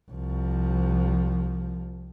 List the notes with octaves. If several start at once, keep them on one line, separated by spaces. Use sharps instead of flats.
C2 F3